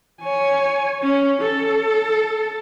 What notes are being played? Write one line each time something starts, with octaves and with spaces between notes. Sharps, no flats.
C#5 G#5
C#4
A4